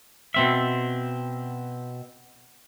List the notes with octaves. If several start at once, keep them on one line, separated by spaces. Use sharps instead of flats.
B2 C4 E5